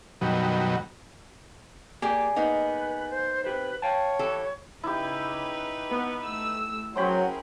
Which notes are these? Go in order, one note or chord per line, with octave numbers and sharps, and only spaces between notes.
F#2 B2 D#3 F#3 G3
A#3 G4 G#4 D5
A#3 B3 D#4 B4
C5
G4 B4 C5
C#5 F5 G5 A5
E3 G4 A4
C#3 D#4 E4 G4 B4
B3
A3 E6
F#3 C#4 G#4 A#4 C5 G5 B5